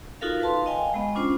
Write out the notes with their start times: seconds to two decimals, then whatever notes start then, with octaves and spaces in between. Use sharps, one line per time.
0.21 D#4 F4 F#4 A4 A#4 F5
0.41 B4 F5 A5 C6
0.66 D#5 F5 G5 G#5
0.94 G#3 B3
1.15 C#4 D4 F4 C5